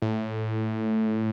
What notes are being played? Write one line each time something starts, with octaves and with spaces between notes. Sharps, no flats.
A2